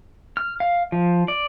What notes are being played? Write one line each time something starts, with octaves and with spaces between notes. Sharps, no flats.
F6
F5
F3
D5